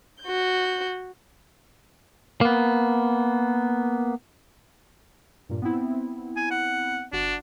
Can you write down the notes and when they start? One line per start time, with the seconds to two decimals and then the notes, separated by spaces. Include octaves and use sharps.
0.22 F#4 G6
2.41 A#3 B3
5.49 G2 A#2
5.62 B3 C4 E4
6.36 G#5
6.51 F#5
7.12 G1 D4 F#4 F#5